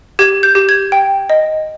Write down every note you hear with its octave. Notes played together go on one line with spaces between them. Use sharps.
G4 G#6
G6
G4
G#6
G5
D#5